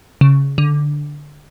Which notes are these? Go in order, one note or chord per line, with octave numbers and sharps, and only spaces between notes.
C#3
D3